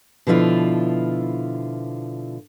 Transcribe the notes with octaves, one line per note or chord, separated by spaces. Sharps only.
B2 D3 F3 E4 F4